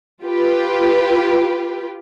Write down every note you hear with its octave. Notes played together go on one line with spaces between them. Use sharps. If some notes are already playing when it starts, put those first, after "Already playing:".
F4 G4 B4